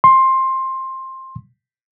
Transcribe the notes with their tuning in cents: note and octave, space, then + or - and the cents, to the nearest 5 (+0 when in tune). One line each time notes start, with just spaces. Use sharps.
C6 +15